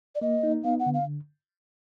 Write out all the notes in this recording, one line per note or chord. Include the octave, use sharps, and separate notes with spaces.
D5
A#3 D#5
D#4
B3 F5
F#5
D3
F5